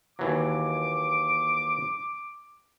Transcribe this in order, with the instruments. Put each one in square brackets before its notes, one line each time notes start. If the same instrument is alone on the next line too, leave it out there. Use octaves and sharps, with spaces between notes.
[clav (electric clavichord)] D#2 E3 F#3 [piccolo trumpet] D6